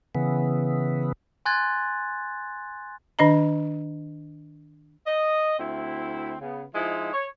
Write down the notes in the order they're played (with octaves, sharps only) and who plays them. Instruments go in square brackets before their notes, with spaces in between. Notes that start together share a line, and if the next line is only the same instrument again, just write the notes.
[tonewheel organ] C#3 E3 B3
[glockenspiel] G#5 C6 F#6 G#6 A6
[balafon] D#3 D4 D#5 A#5
[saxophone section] D#5
D2 C4 E4
C#3 B3
F3 G#3 D#4 E4
C#5